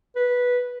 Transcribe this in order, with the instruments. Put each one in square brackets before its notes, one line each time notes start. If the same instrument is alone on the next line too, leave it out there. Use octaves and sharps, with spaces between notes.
[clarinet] B4